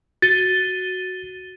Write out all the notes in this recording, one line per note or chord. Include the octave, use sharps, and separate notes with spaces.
F#4 A6 D#7 G7